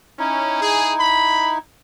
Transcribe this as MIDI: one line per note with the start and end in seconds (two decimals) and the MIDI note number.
0.19 0.57 61
0.19 1.58 63
0.19 1.58 64
0.61 0.92 68
1.00 1.54 83